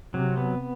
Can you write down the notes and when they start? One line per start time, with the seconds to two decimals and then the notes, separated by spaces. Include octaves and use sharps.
0.14 C3 F#3
0.37 B3